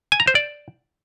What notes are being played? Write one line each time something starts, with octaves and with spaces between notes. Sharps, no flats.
G#5
A#5
C5
D5